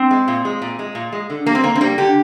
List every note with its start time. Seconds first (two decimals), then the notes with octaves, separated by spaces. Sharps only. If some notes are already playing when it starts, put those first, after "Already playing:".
Already playing: C4
0.11 G#3
0.28 A#2
0.45 G#3
0.62 A#2
0.79 G#3
0.95 A#2
1.13 G#3
1.30 D3
1.46 G3 A#3
1.55 C4
1.64 D3 A#3
1.75 C4
1.81 G3 A#3
1.98 D3 G4